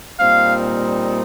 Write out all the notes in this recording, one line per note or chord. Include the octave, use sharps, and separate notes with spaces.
A#2 G3 C4 D#4 F5